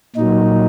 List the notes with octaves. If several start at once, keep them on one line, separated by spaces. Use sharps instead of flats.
A#2 F#3 D#4